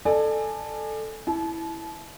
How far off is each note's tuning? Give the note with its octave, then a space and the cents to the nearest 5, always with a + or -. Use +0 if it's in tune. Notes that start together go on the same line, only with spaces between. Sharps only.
A4 +0 D5 +35 G#5 +0
E4 +0 A5 -35